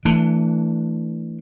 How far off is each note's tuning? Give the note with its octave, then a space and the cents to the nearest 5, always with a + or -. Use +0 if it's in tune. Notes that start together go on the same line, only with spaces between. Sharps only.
E3 +0 A3 +25 D4 +0